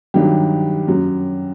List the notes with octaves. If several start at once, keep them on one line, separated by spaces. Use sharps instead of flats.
G2 D#3 F#3 G4
F#2 F#3